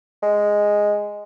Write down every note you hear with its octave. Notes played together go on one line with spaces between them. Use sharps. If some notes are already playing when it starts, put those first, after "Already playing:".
G#3